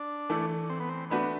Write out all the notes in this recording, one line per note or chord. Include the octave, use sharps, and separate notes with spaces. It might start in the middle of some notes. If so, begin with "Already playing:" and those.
Already playing: D4
E3 A3 E4 A4
C4
B3
C4
A3 B3 D4 F#4 B4